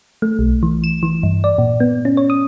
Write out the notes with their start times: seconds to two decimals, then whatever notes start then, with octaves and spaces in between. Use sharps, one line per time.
0.22 A3
0.39 B1
0.63 E3
0.84 E7
1.03 E3
1.23 G2
1.44 D5
1.58 A#2
1.80 B3
2.05 C#4
2.17 C#5
2.30 D#6